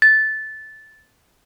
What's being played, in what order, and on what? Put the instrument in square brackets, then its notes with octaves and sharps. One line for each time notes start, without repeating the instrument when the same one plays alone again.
[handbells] A6